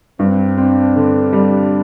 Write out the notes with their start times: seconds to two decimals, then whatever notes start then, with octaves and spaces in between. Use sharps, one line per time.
0.19 G2 C4
0.57 C4 D4
0.96 D3
1.33 G3